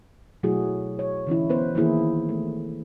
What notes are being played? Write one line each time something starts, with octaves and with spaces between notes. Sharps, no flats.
B2 F#3 A3 E4 F#4 G#4
C#5
D3 E3 C#4 E4
B3 B4 C5
D#3 E3 A#3 E4 G#4
A3